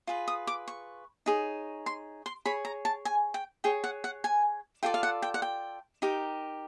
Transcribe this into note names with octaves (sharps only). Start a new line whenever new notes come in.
F4 G#4 B4
D#6
D6
C#6
D#4 G#4 C#5
C6
C6
G#4 C#5 B5
A#5
A5
G#5
G5
G#4 C#5 G5
F#5
F#5
G#5
F4 A4 D5 G5
F5
F#5
G5
F#5
G5
D#4 G4 A#4